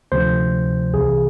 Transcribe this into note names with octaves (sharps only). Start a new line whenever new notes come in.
D2 C3 F3 C5
C2 C3 E3 G#4